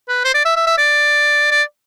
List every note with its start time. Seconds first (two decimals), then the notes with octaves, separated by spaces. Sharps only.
0.08 B4
0.25 C5
0.34 D5
0.45 E5
0.56 E5
0.67 E5
0.78 D5
1.51 D5